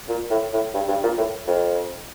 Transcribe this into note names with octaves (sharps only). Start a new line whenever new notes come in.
A#2
A2
A2
G2
G2
A#2
A2
F2